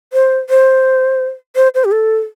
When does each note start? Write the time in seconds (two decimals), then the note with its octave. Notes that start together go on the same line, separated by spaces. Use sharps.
0.13 C5
0.50 C5
1.56 C5
1.75 C5
1.85 G4
1.92 A4